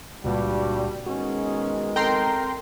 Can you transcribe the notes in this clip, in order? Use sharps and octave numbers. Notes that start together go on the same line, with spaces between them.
C#2 G2 A#2 G3 F#4
B2 D#3 G#3 C#4 F#4
C4 A4 A#4 G5 A#5 C6